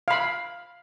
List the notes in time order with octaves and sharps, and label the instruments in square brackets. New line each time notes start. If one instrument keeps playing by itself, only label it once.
[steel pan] F5 B5